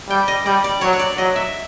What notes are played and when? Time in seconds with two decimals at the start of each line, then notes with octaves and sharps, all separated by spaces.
0.09 G3 G5
0.28 D#5
0.46 G3 D5
0.64 D5
0.81 F#3 C#5
0.93 C#5
0.99 D5
1.18 F#3 D#5
1.36 E5